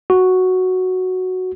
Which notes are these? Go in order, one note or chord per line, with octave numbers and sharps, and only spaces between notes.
F#4